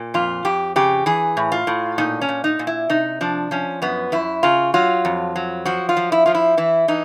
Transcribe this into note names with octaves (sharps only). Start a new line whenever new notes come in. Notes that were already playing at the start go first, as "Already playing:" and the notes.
Already playing: A#2
F2 F4
F2 G4
C#3 G4
E3 G#4
A2
F4
A2
A#2 D#4
C#4
A#2
D#4
A#2
E4
C3 D#4
F3 D4
F3 C#4
F#2 B3
F#2 E4
C#3 F4
F#3 F4
F2
F#3
F3 F#4
F4
F3
E4
F3 F4
E4
E3 E4
E3 D#4